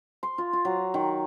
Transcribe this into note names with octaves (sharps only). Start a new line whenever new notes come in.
C6
F4
F4
F#3
D#3